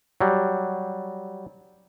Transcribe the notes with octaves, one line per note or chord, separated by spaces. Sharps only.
F#3 G3